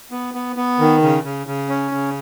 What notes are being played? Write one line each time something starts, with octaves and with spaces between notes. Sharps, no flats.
B3
B3
B3
D#3
C#3
C#3
C#3
C#4
C#3